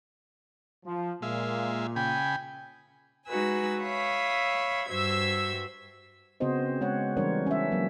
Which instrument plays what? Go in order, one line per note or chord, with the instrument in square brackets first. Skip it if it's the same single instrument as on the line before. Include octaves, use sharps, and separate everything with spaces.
[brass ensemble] F3
[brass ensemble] A#2 [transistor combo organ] G#3 E5 F5
[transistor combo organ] C#3 G#5 B5 [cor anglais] G5
[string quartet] G#3 D#4 F#4 B4 G#5 E6
C#5 E5 F5 B5 D#6
G2 F#4 C5 E5 E6 G#6
[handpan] C#3 B3 C4 F#4 C5 D#5
G#3 C#5 F#5
E3 G3 D4 A#4 C5 C#5
C#4 E5
F#3 A#3